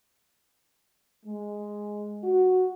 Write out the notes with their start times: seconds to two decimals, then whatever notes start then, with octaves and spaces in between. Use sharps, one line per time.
1.26 G#3
2.24 F#4